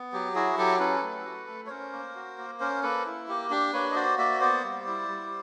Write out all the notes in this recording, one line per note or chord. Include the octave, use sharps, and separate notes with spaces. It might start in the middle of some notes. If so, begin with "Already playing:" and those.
Already playing: B3
F#3 G4
E4 F#4 G#4
F#3 G4 A4
C#4 A4 B4
A3
F#4
A3
C#5
C#4 A#4 C5
A#3
F#4
A#3
C#4 A#4 C5
A#3 A4 B4
E4
A#3 G4
D4 G4
A#3 B4 C#5
D#5
F#4 C5 D5
A#3 D5 E5
B3 C5 D5
G3
E4
G3